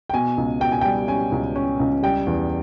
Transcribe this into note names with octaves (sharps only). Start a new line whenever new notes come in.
G5
B2 G#5
C#2
B2 G5
G#5
G3 G5
C#4 G#5
C#2
C#4
C#2
G3 G5
E2